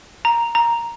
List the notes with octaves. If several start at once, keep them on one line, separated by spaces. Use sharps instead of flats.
A#5
A#5